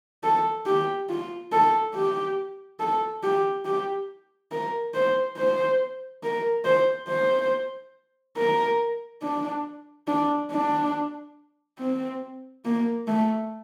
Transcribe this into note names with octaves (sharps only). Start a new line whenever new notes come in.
A4
G4
F4
A4
G4
A4
G4
G4
A#4
C5
C5
A#4
C5
C5
A#4
D4
D4
D4
C4
A#3
A3